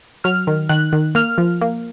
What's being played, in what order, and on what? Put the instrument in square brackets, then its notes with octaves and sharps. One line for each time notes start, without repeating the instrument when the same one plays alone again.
[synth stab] F#3 F6
D#3
D#3 F#6
D#3
A#3 F6
F3
A#3